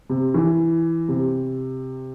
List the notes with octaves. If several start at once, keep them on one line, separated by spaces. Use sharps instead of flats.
C3
E3
C3